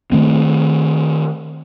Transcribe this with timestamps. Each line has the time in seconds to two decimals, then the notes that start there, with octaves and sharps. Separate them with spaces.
0.12 D#3 A3 C4